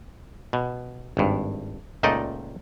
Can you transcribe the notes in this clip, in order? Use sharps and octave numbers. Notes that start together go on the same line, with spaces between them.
B2
G#1 G2
C#2 A#2 A3 D#4 D5 D#5